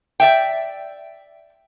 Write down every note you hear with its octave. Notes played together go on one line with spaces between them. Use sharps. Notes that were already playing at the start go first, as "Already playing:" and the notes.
D5 E5 G5